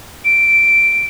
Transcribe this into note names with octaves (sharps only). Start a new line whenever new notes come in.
D7